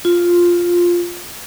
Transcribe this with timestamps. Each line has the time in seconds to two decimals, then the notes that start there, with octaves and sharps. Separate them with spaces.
0.05 F4